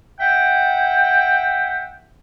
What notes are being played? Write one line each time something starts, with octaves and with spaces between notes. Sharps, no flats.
E5 F#5 G5